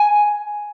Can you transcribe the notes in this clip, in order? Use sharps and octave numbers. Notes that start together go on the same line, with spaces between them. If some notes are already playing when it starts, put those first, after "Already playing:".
Already playing: G#5